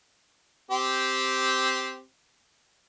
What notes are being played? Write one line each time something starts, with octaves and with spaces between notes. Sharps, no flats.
C4 G4